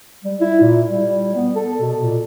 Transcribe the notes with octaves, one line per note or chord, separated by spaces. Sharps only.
G3
E4
A#2
G3
B3
A4
B2
A#2